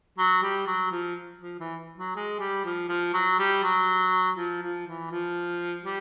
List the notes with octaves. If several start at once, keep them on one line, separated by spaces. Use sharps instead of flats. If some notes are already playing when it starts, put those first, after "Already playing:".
F#3
G3
F#3
F3
F3
E3
F#3
G#3
G3
F3
F3
F#3
G3
F#3
F3
F3
E3
F3
G3